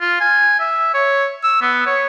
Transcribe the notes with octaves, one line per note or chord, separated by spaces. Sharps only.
F4
G#5
E5
C#5
E6
B3
C#5